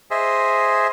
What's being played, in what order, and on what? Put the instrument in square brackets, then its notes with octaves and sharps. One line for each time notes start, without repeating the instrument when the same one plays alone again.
[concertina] G#4 C5 D#5 E5